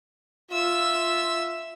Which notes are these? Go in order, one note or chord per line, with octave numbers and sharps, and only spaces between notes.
F4 E5 E6